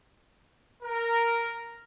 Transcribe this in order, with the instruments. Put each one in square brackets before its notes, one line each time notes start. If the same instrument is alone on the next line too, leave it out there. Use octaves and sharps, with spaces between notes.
[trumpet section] A#4